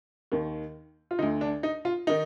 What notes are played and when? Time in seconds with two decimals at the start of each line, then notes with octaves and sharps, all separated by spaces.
0.32 D#2 D#3
1.11 F4
1.19 D2 D3 D#4
1.41 D4
1.63 D#4
1.85 F4
2.07 D#3 D#4